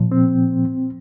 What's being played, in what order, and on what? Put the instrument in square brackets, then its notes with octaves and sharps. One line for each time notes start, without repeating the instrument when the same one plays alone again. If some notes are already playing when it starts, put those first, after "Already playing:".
Already playing: [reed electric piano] A#2 F3
C4